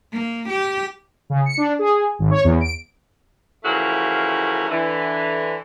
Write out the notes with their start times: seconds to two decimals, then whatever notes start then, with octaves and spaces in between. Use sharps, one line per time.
0.13 A#3
0.49 G4
1.30 C#3
1.46 C#7
1.57 D4
1.79 G#4
2.19 G#1
2.31 C#5
2.44 E2
2.61 D7
3.64 C#3 E3 F3 A3 F#4 A#4
4.69 D3 E3